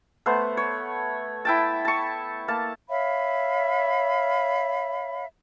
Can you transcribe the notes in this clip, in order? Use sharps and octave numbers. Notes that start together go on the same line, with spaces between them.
A3 B3 C5 F#5
C#5
E4 G5 A5
A5 C#6
A#3 A5
C#5 E5 F5 B5